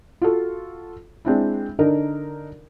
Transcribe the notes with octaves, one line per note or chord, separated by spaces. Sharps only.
F4 F#4 A4
G#3 C4 D4 E4
D3 D4 D#4 A#4